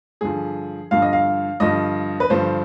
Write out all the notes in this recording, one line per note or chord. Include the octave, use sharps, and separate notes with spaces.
G2 D3 F3 G#4
G2 D3 F3 F5
D#5
F5
G2 D3 F3 D#5
B4
G2 D3 F3 C5